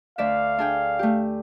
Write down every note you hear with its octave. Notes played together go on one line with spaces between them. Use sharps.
D2 D5 E5 F5
D4 G#4 G5
A3 G4